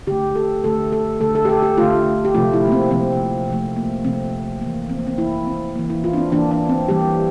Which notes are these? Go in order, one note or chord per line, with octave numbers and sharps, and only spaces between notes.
D3 A3 G4
A4
D3 A3 A4
A4
D3 A3 A4
A4
G4
A4
G4
D3 A3 F4
G4
C3 F3 A3 F4
E4
A#3
C4
C3 F3 A3 C4
C3 F3 A3
A#3
C3 F3 A3 C4
E3 A#3
C4
A#3
C4
E3 A#3 E4
C4
E3 A#3
E4
F4
D4
C4
E3 A#3 D4
D4
C4
E3 G3 A#3 G4